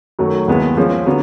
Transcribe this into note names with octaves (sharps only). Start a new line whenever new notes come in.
F#2 D#3 F#3 A3
D#2 D#3 G#3 B3 E4
F3 G#3 C#4
D3 F#3 B3